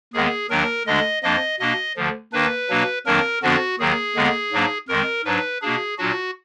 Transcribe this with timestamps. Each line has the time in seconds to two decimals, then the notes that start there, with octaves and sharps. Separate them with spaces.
0.13 D#2 D#3 G#3 B3 G#4
0.50 D#2 D#3 F#3 D4 A#4
0.87 D2 D3 G#3 D4 D#5
1.23 F2 F3 A#3 D4 D#5
1.60 B2 A#3 D4 D#5
1.96 D2 D3 F3
2.33 D#2 D#3 A#3 D4 B4
2.69 B2 F#3 A#3 D4
3.06 F2 D#3 F#3 A#3 D4 A#4
3.43 F2 D3 F3 B3 D4 F#4
3.79 D#2 D#3 F#3 G#4
4.16 D#2 D3 G#3 B3
4.53 G#2 F#3 A#3 D4
4.88 F2 D#3 G#3 A#4
5.25 G#2 F#3 D4 B4
5.61 B2 A#3 D4 G#4
5.98 A#2 F#3 D4 F#4